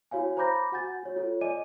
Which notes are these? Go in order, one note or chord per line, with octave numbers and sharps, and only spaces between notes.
E4 F#4 C#5 F5 G#5
C5 A#5 B5 D6 G6 A#6
F#4 F#5 G#5 G6 A6
F#4 C#5
F4 A4 C#5
D5 D#5 G#5 D6 D#7